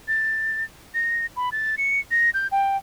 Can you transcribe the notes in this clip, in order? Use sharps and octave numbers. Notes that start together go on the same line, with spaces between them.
A6
A#6
B5
A6
C#7
A#6
G6
G5